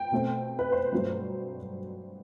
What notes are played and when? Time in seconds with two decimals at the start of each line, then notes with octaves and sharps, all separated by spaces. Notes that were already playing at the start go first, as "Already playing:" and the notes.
Already playing: G5
0.12 B2 A3 C4
0.59 B4
0.72 C5
0.92 G2 F#3 A3